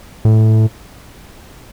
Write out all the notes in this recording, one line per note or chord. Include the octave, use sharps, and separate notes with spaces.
A2